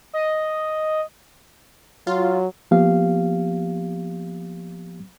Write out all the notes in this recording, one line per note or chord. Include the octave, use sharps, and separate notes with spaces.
D#5
F#3 F4
F3 A#3 B3 G4 F5